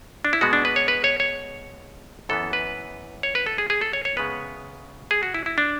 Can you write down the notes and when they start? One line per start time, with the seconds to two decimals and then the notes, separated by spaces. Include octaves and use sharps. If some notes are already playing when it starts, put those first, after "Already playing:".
0.25 D4
0.33 E4
0.41 B2 G#3 B3 F#4
0.53 D4
0.65 B4
0.76 C#5
0.88 B4
1.04 C#5
1.20 C#5
2.29 F#2 E3 B3 A4
2.53 B4
3.23 C#5
3.35 B4
3.46 A4
3.58 G#4
3.70 G#4
3.81 A4
3.93 C#5
4.05 C#5
4.17 F#2 C#3 G#3 B3 B4
5.11 G#4
5.23 F#4
5.34 E4
5.46 E4
5.58 D4